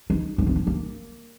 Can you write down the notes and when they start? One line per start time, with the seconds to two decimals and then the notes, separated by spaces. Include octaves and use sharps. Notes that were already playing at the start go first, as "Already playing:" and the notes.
0.10 D#4
0.38 D4
0.47 C4
0.56 D4
0.67 A#3